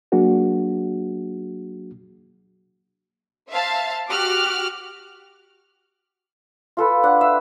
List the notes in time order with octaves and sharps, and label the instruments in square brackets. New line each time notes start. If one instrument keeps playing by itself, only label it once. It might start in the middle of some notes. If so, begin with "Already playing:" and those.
[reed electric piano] F#3 A#3 D4 F#4 G#4
[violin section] C5 E5 F5 A5
F#4 G4 D6 F6 F#6
[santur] F4 A4 B4
D4 F#5
E5 F5